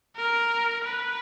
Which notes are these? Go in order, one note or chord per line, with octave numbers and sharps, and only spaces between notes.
A#4
B4